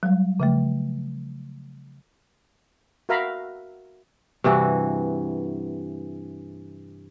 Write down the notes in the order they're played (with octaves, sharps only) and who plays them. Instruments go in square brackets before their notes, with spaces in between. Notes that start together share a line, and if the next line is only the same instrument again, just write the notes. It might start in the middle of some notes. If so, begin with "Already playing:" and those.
[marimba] F#3 G3
C#3 F3 A3
[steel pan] F#4 A#4 E5 F5 A#5 B5
[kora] G2 C3 E3 F#4